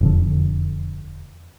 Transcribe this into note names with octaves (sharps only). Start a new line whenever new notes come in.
E1 F2 D3